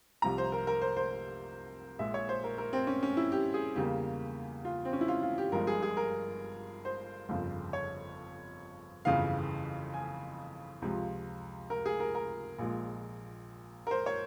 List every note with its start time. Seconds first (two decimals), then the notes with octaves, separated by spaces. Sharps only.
0.22 C2 C3 F3 A#5
0.38 C5
0.52 A#4
0.67 A#4
0.82 C5
0.96 C5
1.99 A#1 A#2 G#3 E5
2.14 C#5
2.29 C5
2.44 A#4
2.58 A#4
2.73 C4
2.87 C#4
3.03 C#4
3.17 E4
3.32 G4
3.54 G#4
3.76 E2 C#3 G3 A#3 G4
4.65 F4
4.85 C4
4.93 C#4
5.01 E4
5.08 F4
5.23 F4
5.38 G4
5.52 G1 G2 F3 G#3 A#4
5.67 G#4
5.83 G#4
5.97 A#4
6.85 C5
7.29 G1 F2 C#3 F3
7.73 C#5
9.05 G1 F2 C#3 E3 F5
9.94 G#5
10.82 C#2 C3 F3
11.70 A#4
11.86 G#4
12.00 A#4
12.15 A#4
12.59 A#1 A#2 F3 G#3
13.87 A#4
13.91 C5
14.06 C#5